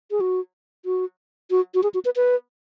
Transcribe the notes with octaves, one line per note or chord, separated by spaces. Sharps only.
G#4
F#4
F#4
F#4
F#4
G#4
F#4
B4
B4